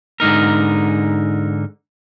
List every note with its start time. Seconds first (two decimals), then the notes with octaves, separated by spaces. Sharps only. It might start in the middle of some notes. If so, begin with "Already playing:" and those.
0.20 G#2 D3 D#4 A#4